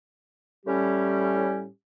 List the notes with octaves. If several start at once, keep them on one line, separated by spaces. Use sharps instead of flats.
A2 G3 C#4 G4